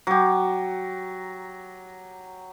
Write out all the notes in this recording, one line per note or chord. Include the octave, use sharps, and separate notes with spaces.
F#3 G4